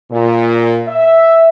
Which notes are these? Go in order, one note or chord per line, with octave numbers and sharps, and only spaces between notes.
A#2
E5